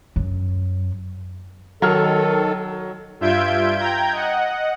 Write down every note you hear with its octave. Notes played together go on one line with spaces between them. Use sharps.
F#2
D#3 F#3 A4 F6
G2 F4 E5 G6 G#6 D7
G5 A#5 G6 G#6
D#5 F#5